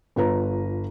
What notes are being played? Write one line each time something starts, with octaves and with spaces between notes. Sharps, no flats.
G1 F4 B4 A#5